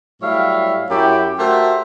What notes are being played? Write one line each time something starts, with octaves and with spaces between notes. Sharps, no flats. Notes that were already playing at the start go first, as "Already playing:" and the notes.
A2 F#3 G3 C#5 E5 F5
F#2 E4 G4
A3 F#4 G4 A#4 C5 E5